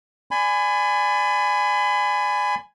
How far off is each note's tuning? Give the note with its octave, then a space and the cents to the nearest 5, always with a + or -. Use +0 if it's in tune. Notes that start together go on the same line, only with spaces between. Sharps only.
D5 +0 G#5 +0 B5 +30